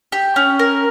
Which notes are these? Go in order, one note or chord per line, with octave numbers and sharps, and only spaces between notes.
G4
C#4
A#4